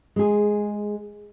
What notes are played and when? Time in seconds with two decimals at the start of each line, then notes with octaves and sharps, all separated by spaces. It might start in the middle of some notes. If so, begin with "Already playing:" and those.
0.16 G#3 G#4